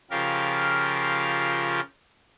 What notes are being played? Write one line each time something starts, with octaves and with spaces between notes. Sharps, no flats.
C#3 F3 F4 G4 A#4 F5